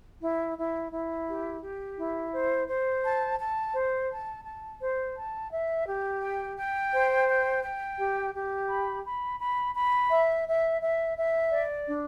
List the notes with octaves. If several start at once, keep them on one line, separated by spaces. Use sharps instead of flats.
E4
E4
E4
G4
G4
E4
C5
C5
A5
A5
C5
A5
A5
C5
A5
E5
G4
G5
G5
C5
G5
G5
G4
G4
B5
B5
B5
B5
E5
E5
E5
E5
D5
D4